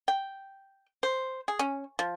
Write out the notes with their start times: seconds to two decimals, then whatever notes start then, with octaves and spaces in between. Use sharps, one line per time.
0.08 G5
1.03 C5
1.48 G#4
1.59 C#4
1.99 F3